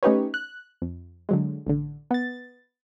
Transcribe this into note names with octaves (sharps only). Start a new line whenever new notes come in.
A3 C#4 D#4 G4 B4 C#5
F#6
F2
D3 F#3 G#3
A1 D3
B3 A6